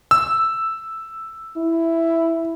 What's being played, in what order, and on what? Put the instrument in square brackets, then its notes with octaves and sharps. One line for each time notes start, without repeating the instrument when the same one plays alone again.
[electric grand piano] E6
[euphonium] E4